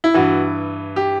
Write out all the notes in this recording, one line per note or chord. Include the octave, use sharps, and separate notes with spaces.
E4
G2 E3 F#4
G4